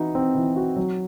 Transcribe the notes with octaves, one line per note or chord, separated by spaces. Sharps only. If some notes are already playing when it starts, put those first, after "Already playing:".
Already playing: E3 D#4 F#4
C4
E3
F#4
F#3